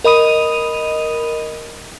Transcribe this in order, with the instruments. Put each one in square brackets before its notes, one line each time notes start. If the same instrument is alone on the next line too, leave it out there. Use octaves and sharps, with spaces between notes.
[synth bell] A#4 D#5 B5 D#6 D#7 F7